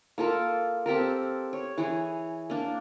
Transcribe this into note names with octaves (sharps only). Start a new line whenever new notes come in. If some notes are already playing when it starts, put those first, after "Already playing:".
A#3 F4 A4 A#4
C4 G4 A4 A#4
C#5
E3 G#4 C#5
A#3 D4